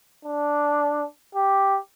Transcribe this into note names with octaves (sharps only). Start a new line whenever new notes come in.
D4
G4